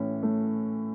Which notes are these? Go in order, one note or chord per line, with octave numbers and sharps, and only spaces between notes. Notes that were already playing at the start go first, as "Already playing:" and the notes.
Already playing: A2 E3 C#4
A3